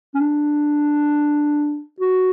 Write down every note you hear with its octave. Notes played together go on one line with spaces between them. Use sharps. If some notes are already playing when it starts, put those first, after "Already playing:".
C#4
D4
F#4